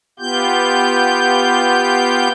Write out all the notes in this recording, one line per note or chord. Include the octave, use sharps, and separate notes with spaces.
B3 F4 G4 G6